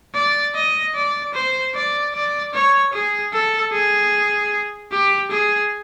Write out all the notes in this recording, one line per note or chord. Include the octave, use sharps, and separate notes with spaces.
D5
D#5
D5
C5
D5
D5
C#5
G#4
A4
G#4
G4
G#4